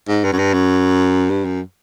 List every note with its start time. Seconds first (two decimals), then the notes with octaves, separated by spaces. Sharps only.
0.08 G#2
0.24 G2
0.32 F#2
0.39 G2
0.53 F#2
1.30 G2
1.45 F#2